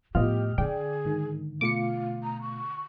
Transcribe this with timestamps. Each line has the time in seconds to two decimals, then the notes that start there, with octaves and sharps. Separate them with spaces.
0.15 A2 F3 B3 F4 G4 D#5 F6
0.58 D3 G#4 D5 G5
1.05 G#2 D#3
1.61 B2 A3 F4 F5 D6 C#7
2.24 A#5
2.42 C#6